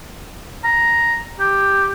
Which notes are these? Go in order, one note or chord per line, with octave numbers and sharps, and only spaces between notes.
A#5
G4